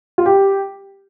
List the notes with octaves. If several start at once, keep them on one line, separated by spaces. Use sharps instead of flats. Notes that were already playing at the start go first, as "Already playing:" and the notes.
F4
G4